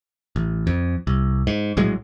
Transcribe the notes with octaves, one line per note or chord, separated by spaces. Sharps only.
A1
F2
C2
G#2
A#1 A2 F#3 G#3